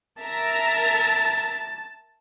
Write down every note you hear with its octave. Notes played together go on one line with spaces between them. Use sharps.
A#4 E5 A5 A#5